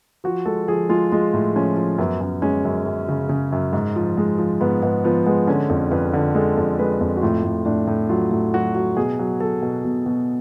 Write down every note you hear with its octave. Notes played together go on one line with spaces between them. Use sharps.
F3 F#4
G#3 A4
F3 G#4
G#3 F4
G#3 F4
A2
F3 C#4
F3
F#2 B3
F#2
G#3 C#4
F#2
F#2
C#3
C#3
F#2
G#2
F3
G#3
F3
G#2 B3
G#2 B3
F3 B3
G#3 B3
D3 C#4
F2
F2 B4
D3
G#3 A4
F2
G#3 B4
F2
F#4
A2 F4
A2
A2 D4
A2
F#3 F4
A2
F#3 F#4
F#3
B2 G#4
F#3
F#3 A4
B2
B2
B2